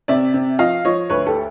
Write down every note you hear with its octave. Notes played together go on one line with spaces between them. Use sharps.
C3 D5 E5
C3
F3 D#5 F5
F3 C#5 D#5
D2 B4 C#5
G4 A4